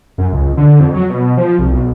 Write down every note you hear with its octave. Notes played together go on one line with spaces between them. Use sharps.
F#2
C#2
D3
F2
F#3
B2
F3
C2
B1